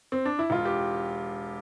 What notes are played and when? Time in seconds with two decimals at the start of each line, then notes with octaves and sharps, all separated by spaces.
0.12 C4
0.25 D4
0.39 E4
0.50 E1 F4
0.65 G4